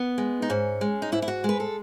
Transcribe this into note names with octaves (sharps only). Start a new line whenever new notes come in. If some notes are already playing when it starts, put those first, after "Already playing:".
Already playing: B3
G#3
D#4
G#2 C#4
G#3
D#4
G#2 E4
E4
F#4
G#3 B4
A4